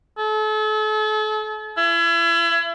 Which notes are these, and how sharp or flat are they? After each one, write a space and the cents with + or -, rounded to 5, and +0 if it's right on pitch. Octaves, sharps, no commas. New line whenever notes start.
A4 -40
E4 +35